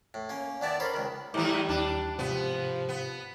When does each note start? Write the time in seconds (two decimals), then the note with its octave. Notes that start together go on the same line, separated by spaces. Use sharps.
0.14 A2
0.29 A#3 C#4
0.61 D#3 B3 E4 D5 A5
0.80 A4 A#4 C5 C#5 B5
0.94 C#2 D#3
1.34 G#2 E3 G3 A#5 D6
1.69 D#2 D4
2.19 G#2 C3 F3 B3 G4
2.88 B3